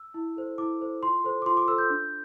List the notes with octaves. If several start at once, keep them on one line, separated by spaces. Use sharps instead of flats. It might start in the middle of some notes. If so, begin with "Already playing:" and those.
Already playing: E6
E4
A4 C5
E4 D6
A4 C5
F4 C6
A4 C5
D6
F4 C6
D6
A4 C5 E6
G6
D4